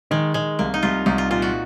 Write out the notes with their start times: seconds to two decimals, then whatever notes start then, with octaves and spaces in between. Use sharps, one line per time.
0.11 D#3 G#3
0.34 D#3 G#3
0.59 C2 A#3
0.74 D#4
0.83 C2 F4
1.06 C2 D#4
1.18 F4
1.30 A#2 F4
1.42 F#4